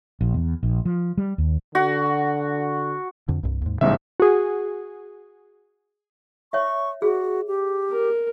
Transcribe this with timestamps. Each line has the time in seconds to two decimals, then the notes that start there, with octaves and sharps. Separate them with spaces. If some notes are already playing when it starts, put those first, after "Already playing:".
0.21 A#1
0.34 E2
0.63 A#1
0.85 F3
1.18 G3
1.38 D#2
1.75 D3 F#4
3.28 F2 D3
3.43 C2 G2
3.62 D#2 G#2
3.81 A1 G#2 C#3 G3 B3 E5
4.20 F#4 G#4
6.53 C#5 E5 C#6
7.02 F#4 G#4
7.47 G4
7.91 A#4